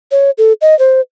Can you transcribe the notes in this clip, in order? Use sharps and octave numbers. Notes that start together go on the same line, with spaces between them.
C#5
A4
D#5
C5